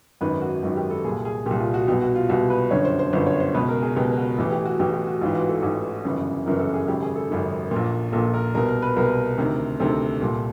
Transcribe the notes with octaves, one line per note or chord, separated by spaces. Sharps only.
G#1 F#2 D#3 B4
F#4
G#1 F#2 D#3 F#4
G4
A4
C2 A#2 G#4
G#4
C2 A#2 G4
F4
F#4
C2 B2 G4
F#4
F4
C2 B2 F#4
B4
G1 F#2 D3 C#5
C5
C5
G1 F#2 D3 C5
C#5
C5
C#2 B2 B4
A#4
G#4
C#2 B2 G4
F#4
A1 A2 E3
G4
F#4
A1 A2 E3 G4
G4
F#4
A1 G#2 E3 F4
F#4
A4
A1 G#2 E3
G1 F#2 C#3 E3
G1 F#2 C#3 E3 A#4
A4
G#4
G#1 F#2 C#3 G4
G#4
A4
G#1 F#2 C#3
A#1 A#2
A#1 A#2 A4
A#4
C2 B2 A#4
A#4
B4
C2 B2 A#4
D2 C3 D#3
D2 C3 D#3 A4
C2 A#2